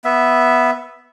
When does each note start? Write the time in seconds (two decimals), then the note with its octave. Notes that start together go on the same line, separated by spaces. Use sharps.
0.04 B3 E5